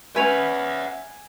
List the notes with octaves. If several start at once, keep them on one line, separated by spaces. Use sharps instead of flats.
C#4 B4 E5 F#5 G#5 G#6 F7